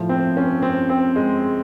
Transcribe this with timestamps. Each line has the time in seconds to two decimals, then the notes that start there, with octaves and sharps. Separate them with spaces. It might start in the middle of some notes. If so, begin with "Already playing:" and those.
Already playing: A2 F3
0.09 C4
0.37 C#4
0.62 C4
0.90 C4
1.16 G#3